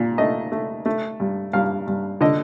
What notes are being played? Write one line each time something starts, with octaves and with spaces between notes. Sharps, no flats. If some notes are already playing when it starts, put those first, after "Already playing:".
Already playing: A#2
A3 D#5
A3
A3
G2
G2 F5
G2
D3 D#5